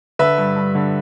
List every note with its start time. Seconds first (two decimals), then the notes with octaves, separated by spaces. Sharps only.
0.19 D3 B4 E5
0.38 G2
0.56 G2
0.75 D3